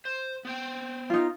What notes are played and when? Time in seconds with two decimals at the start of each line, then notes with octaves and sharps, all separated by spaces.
0.05 C5
0.45 B3 C5 G5
1.10 D#4 F4